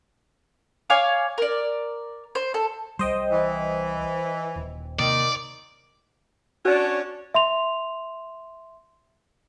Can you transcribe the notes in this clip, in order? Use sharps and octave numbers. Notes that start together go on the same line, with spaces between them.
C#5 F5 G#5 D6
A#4 D5
C5
A4
C2 G3 C5 D#5 G5
E3
D#1
C3 D#3 A#3 D5
C#4 D4 F#4 C#5
E5 C6 F7